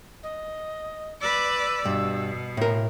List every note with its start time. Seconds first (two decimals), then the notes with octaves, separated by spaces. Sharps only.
0.23 D#5
1.22 B4 D5 E6
1.85 G2 B2
2.57 A2 A#4